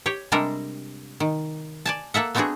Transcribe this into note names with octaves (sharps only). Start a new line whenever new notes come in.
G4 C#5
C3 G3 G#3 D4 A4 A#4
D#3
D5 G#5 A5
A#3 A4 E5 F#5
A3 B3 C4 D4 F#4 G#4